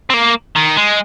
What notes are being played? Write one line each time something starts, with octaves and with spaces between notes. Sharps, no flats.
C4
A#3
D#3
G#3